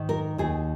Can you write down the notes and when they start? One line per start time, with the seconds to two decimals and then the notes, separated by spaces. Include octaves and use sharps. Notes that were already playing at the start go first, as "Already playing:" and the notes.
Already playing: G#2 D#3
0.09 A#4
0.38 D#2 D#3 G#4